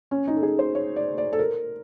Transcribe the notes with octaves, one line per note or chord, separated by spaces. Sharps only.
C#4
D#4
A4
G#4
C5
C#5
D5
D5
A4
A#4